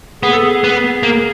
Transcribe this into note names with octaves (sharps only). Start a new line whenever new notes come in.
B3 G#4
A4
G#4
B3
A#3